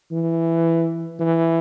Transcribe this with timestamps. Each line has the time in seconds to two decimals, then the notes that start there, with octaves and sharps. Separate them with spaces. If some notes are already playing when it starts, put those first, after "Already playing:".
0.11 E3
1.20 E3